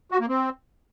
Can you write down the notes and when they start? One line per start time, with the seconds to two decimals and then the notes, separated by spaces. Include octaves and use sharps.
0.12 F#4
0.20 A#3
0.29 C4